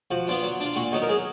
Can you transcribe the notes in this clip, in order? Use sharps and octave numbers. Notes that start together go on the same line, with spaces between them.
F3 F#4
B3 D4 F4
F#3
D4 F4
A#2 F#4
F#3 B3 D#4 F#4
A#4
F#3 G#4